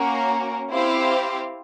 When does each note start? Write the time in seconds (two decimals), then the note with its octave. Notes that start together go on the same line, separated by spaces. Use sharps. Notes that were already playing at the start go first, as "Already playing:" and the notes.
Already playing: A#3 C#4 F#4 A#4
0.71 C4 E4 G4 C5 F5